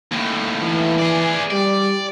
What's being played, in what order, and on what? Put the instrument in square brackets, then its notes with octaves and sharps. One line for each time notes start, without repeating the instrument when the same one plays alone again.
[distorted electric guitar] D#2 A2
[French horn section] E3
[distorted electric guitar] G#4 D5
[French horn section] G3 [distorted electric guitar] D5